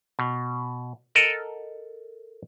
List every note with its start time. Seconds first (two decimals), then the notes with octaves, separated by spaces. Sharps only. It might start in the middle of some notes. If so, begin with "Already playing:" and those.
0.19 B2
1.15 A4 A#4 D#5 F#5